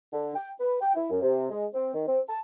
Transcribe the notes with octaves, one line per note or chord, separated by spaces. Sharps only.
D3
G5
B4
G5
E4
F#2
C3
G#3
C4
D#3
C4
A5